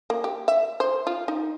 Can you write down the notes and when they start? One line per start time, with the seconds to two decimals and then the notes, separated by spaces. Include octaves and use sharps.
0.10 A#3
0.24 G4
0.48 E5
0.80 C5
1.07 F4
1.28 D#4